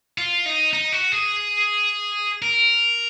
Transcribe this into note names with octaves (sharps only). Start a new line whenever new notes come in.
F4
D#4
D#4
F#4
G#4
A#4